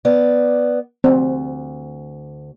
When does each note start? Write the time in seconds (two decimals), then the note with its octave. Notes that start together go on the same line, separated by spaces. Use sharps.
0.05 B3 D5
1.04 D2 C4